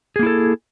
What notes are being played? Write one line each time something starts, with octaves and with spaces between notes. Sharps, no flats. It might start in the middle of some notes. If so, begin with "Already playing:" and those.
A#3 E4 G#4 A4